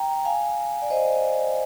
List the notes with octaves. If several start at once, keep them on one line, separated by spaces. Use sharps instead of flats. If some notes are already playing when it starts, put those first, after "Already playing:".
Already playing: G5 A#5
F5 G#5
D5
C5 D#5